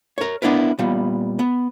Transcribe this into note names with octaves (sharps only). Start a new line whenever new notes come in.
A#4 C#5
B3 D4 E4 A#4 B4
A#2 G3 B3
B3